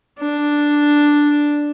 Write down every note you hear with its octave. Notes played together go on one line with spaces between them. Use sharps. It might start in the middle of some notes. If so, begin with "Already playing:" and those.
D4